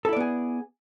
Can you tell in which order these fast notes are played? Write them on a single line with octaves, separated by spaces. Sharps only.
A4 E4 D5 B3 G#4